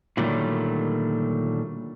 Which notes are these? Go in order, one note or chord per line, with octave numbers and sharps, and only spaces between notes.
A#2 D3 D#3 F#3 G3 A3